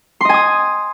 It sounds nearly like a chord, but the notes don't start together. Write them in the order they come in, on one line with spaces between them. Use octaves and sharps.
C6 D#5 G#5 D#6